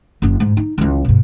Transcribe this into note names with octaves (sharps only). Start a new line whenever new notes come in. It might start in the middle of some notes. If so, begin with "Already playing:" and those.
F#1 D4
G#2
D#4
C#2 E3
G2 B2